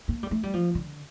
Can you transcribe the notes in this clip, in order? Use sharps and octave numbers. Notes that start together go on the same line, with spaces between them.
A#3
G3
A3
G3
F3
D3